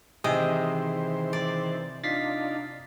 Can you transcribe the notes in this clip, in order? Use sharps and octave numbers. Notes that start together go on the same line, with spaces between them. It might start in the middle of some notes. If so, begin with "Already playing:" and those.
C3 D#3 E3 G#4 C5 D#5 G5
D5
D4 D#4 F4 A6 B6 C7